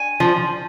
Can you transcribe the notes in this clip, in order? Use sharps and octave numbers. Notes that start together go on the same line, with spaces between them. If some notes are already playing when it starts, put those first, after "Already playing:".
Already playing: G#5
F3